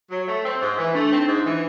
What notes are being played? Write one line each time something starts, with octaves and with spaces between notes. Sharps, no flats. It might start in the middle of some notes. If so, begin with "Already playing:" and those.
F#3
A3
C4
G#2
E3
A3 D4
C4
D#4
G#2
E4
E3